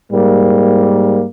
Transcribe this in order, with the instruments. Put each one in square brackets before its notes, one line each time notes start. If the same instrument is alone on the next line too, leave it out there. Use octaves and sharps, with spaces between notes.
[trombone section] G#2 G3 A#3